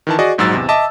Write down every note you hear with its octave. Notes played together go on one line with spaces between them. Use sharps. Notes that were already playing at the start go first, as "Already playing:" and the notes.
D#3 E3 A5
F#4 G#4 D5 D#5
A#1 G#2 F#3 E6 A6
E2 C3
D#5 E5 A5 D6